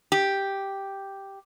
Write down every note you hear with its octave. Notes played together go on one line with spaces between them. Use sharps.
G4